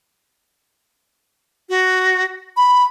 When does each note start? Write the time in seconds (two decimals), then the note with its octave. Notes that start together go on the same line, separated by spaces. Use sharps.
1.69 F#4
2.57 B5